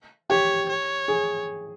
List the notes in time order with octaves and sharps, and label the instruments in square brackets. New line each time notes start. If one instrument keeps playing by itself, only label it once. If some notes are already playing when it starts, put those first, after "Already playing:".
[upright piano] G4 [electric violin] C#5
[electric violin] C#5
[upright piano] G#4